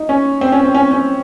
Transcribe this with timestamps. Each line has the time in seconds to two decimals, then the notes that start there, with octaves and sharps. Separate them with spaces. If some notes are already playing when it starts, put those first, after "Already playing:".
Already playing: D#4
0.09 C#4
0.41 C4
0.52 C#4
0.64 C4
0.74 C#4
0.91 C#4